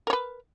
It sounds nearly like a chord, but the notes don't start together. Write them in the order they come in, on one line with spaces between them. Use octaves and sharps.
A#4 C#5 B4